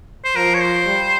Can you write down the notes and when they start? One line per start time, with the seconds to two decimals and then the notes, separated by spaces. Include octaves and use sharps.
0.24 C5
0.36 F3 A#4
0.55 C#5
0.61 C5
0.87 G3